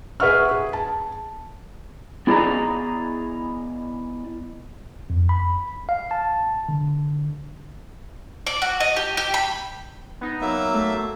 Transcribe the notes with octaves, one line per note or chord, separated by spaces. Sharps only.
G#4 B4 E5 F#5 C#6 F6
G#4
A5
B3 E4 G#4 D5 D#5 A#5
F2
B5
F5
A5
D3
D5
F#4
D#5
G4
G4
B5
B3 D#4
F#3 A#3 E5
A3